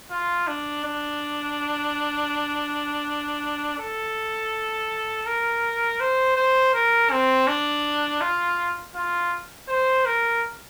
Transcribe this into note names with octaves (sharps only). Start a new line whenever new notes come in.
F4
D4
D4
A4
A#4
C5
C5
A#4
C4
D4
F4
F4
C5
A#4